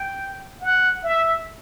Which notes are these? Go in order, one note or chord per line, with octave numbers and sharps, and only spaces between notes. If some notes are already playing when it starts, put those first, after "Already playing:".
Already playing: G5
F#5
E5